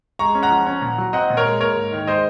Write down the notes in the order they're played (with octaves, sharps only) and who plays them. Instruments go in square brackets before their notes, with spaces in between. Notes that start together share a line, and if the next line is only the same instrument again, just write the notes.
[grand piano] G#3 A#5 C#6
C#4
F#5 A#5
F3
C#4
A#2
F#3
C4 D#5 F#5
A#2
A#4 C#5
G#3
A#3 A#4 C#5
G#2
D#3
G#3 C5 D#5